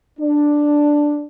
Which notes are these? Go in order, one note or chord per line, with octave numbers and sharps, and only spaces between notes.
D4